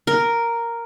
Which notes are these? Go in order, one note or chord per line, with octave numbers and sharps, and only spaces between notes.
A#4